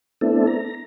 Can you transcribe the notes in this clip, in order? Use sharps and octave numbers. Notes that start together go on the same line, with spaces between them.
A3 B3 C4 D4 E4 A4
A#5